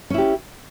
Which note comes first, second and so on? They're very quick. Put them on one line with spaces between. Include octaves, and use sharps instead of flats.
C#4 E4 G4